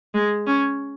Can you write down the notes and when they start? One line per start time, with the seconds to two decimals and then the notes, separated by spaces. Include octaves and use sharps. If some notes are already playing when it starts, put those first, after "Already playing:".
0.14 G#3
0.47 C#4